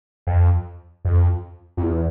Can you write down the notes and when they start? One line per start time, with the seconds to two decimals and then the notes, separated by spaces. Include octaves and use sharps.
0.27 F2
1.05 F2
1.77 F2
1.83 E2